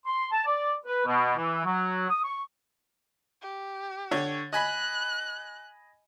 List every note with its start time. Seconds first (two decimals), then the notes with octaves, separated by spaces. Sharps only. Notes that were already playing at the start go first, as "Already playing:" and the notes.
0.06 C6
0.32 A5
0.46 D5
0.86 B4
1.06 B2
1.37 E3
1.65 F#3
2.09 D#6
2.24 C#6
3.42 G4
4.11 D3 C#5
4.53 D#5 G#5 B5 F#6